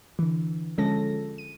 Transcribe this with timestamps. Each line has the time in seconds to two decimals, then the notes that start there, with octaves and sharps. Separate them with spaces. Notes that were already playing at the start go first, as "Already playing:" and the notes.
0.19 D3 E3
0.78 D3 F3 G#3 C#4 A4 A#6
1.38 D#7